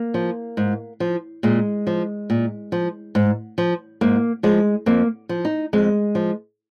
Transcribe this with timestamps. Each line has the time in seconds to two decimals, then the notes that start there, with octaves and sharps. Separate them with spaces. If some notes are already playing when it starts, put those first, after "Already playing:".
Already playing: A#3
0.14 F3
0.57 G#2
1.00 F3
1.43 A#2 G#3
1.87 F3
2.30 A#2
2.72 F3
3.15 G#2
3.58 F3
4.01 G#2 A#3
4.43 F3 G#3
4.86 F2 A#3
5.29 F3
5.45 D#4
5.73 F2 G#3
6.15 F3